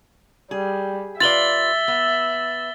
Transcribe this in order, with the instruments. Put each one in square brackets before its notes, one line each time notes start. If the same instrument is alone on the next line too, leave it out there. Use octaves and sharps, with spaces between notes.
[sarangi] G3 [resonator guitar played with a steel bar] G#4
[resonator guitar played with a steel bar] F4 B4 D5 [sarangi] E5 [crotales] A6 F#7 G7
[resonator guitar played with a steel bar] B3